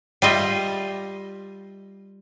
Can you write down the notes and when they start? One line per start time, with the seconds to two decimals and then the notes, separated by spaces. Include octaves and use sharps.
0.22 G3 F4 D#5 E5